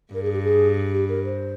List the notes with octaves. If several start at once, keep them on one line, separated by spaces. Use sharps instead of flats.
G2 A#4
G#4
G4
G#4
G4
A#4
C5